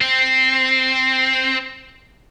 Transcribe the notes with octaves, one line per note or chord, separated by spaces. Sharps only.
C4